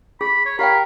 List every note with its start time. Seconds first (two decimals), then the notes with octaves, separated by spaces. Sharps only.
0.21 G#4 B5
0.45 C#5
0.59 G4 A#4 F5 G5 B5